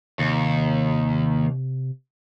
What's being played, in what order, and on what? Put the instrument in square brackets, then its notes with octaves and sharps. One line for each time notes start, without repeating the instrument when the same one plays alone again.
[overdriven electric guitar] D#2 [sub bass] C3